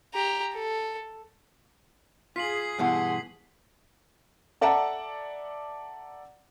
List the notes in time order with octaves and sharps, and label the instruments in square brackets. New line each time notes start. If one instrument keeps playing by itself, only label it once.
[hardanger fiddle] G4 A#5
A4
[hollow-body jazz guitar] F4 [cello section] G#4 [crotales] B6 C7 F#7
[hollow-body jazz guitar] G2 B2 E3 [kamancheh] F#5 C6
[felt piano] A4 D5 E5 F#5 A5 A#5